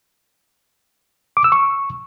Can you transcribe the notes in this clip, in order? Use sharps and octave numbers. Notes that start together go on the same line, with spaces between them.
D6
E6
C#6